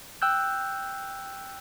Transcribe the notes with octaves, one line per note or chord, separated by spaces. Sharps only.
G5 E6 F#6 G6